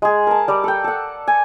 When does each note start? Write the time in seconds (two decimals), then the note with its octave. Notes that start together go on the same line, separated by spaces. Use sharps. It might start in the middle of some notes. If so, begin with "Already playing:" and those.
0.02 G#3 G#4
0.27 A#4 A5
0.48 G3 D5 D#5
0.64 A4 G5
0.84 A4 F#5
1.27 G#5